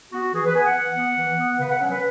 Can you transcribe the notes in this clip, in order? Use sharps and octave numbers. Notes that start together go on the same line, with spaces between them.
B3 F#4
E3 G#4
B4
B3 G#5
F#5
E3
B3
E3
B3
C#3 B4
F#5
F#3 C#4
B4